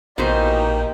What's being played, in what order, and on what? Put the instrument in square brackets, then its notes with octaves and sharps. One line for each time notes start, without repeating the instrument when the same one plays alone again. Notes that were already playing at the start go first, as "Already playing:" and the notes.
[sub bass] A#1 [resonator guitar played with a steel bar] B2 E3 C5 [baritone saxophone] A#3 [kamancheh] D#4 G4